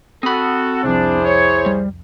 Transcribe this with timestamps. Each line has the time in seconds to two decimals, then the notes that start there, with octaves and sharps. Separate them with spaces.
0.23 C4 F#4 A4 B5 D#6
0.84 C2 F2 D4 E4 G#4 C5
1.24 C#5
1.66 G3